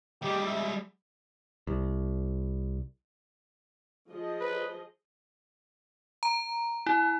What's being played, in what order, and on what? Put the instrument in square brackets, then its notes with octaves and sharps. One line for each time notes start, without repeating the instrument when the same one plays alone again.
[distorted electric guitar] G3 G#3 [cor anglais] G4
[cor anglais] E5
[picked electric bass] C2
[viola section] F3 G#4 D#5
[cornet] B4
[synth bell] A#5
E4